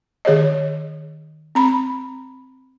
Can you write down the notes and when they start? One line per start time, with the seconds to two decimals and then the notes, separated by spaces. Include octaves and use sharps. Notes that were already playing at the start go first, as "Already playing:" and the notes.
0.25 D#3 G#4 C#5 D#5
1.55 C4 A#5 B5